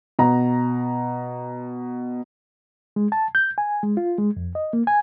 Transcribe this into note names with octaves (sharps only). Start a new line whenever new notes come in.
B2 A#5
G#3
A5
G6
G#5
G#3
F4
G#3
F2
D#5
A#3
G#5